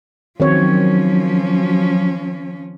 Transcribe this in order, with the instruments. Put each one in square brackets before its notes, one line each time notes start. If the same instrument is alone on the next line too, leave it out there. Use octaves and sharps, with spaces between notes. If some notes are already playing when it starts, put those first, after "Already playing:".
[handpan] D#3 C4 C#5 [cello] F3 C#4 [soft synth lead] F#3